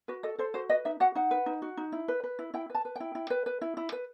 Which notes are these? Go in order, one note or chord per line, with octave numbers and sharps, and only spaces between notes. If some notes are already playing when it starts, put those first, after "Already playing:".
F#4 B4
A4 D#5
A4 C5
F#4 C5
B4 D#5
D#4 E5
F#4 F#5
D#4 F#5
B4
D#4
F#4
D#4
E4
B4
B4
E4
E4 G5
B4 A5
B4
E4 G5
E4
B4
B4
E4
E4
B4